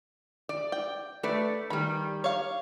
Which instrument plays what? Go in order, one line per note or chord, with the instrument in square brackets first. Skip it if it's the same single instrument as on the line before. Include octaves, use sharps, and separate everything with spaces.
[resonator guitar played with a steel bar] D5
[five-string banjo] G5
[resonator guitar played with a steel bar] A3 B4 D5
[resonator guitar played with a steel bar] D#3 G3 [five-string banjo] B5
[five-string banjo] C#5 F5